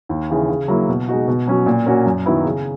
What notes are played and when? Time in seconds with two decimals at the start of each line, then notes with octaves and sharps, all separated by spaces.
0.09 D#2
0.30 C#3 E3
0.49 C#3
0.68 F#3 A#3 E4
0.89 B2
1.08 G#3 D#4 F#4
1.28 B2
1.47 F#3 C#4 F#4
1.66 A#2
1.86 A#3 C#4 F#4
2.06 F#2
2.26 D#3 F#3 B3 E4
2.45 C#3